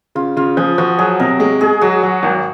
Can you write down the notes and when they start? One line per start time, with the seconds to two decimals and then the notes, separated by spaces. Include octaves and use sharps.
0.15 C#3 F4
0.37 C#3 F4
0.57 F3 G#4
0.78 F3 F#4
0.99 F#3 G#4
1.20 C3 A#4
1.40 G#3 G#4
1.61 G#3 G#4
1.81 F#3 F#4
2.03 F#3
2.23 G#1